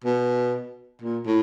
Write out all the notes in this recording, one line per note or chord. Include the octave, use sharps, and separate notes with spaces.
B2
A#2
A2